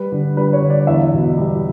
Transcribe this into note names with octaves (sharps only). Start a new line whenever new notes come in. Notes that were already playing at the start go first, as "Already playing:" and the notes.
Already playing: G3 B4
D3
G3 B4
C#5
D3
D5
E2 E5
B2
G3